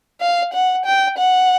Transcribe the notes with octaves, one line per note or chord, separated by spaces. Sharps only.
F5
F#5
G5
F#5